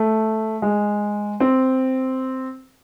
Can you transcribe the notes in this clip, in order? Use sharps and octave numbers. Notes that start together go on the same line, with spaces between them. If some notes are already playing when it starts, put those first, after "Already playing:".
Already playing: A3
G#3
C4